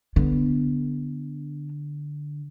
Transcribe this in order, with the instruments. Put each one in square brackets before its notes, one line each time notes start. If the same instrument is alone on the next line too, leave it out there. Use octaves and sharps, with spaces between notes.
[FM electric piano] D3 [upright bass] B3